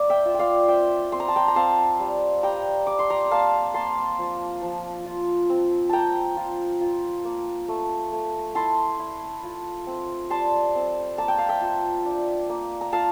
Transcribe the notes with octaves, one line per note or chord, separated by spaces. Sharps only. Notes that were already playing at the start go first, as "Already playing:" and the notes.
Already playing: A#3 D5
E5 G5
F4
G5
D5 F5
C4 E5 G5
C4 C6
A#5
A5
G5 A#5
A#5
C4 F5 A5
G3
G3 G5 A#5
G3 D6
C6
A#5 D6
A#3 F5 A5
A#3 A5 C6
F3
F3
F4
C4
A#3 G5 A5 A#5
F4
F4
A#3
A3
A3
E4 A5 C6
E4
F4
C4
G3 A5 C6
C4
A#3 A5
G5
F5
E5 G5
F4
D4
A#3
A#5
F4 F5 A5